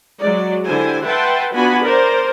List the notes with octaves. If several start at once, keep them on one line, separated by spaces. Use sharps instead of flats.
F#3 G#3 D5
D3 E4 G4 C5 G#5
B4 E5 F#5 G5 A5 C6
B3 D4 F4 F#4 G#5 B5
A#4 C5 D5